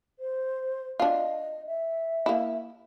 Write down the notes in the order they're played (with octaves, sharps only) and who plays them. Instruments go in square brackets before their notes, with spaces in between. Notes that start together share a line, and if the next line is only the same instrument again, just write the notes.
[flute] C5
[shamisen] D4 F4 [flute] D#5
[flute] E5
[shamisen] A#3 E4